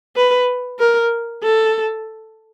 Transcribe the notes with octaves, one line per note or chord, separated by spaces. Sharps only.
B4
A#4
A4